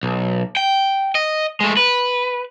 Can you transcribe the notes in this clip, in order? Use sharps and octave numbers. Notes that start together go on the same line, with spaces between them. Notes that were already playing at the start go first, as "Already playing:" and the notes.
B1
G5
D#5
G#3 A3
B4